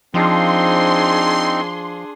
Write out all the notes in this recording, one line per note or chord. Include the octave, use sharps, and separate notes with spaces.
F3 C4 D4 D#4 G#4 C6